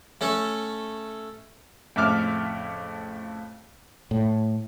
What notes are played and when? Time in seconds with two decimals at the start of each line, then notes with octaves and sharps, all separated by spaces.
0.21 A3 C#4 A4
1.96 F2 A2 C#3 E5 D6 F6
4.11 A2